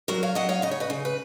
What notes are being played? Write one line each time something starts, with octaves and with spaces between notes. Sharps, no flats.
F#3 F#4 A#4
C#5 F5
F#3 D#5 F#5
C#5 F5
C#3 D#5
C#5
B4 D#5
C#3
B4